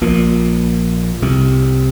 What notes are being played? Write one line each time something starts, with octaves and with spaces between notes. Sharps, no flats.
A#1 A#2
C2 C3